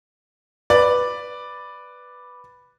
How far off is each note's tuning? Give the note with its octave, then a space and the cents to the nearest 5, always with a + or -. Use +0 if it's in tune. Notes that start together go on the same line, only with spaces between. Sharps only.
B4 +0 D5 +0